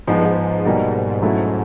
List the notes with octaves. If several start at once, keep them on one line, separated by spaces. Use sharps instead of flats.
G#2 F3 G#3 B3 D#4
G2
G#2
B2 G3 A#3 D#4
F#3 A3 C#4 E4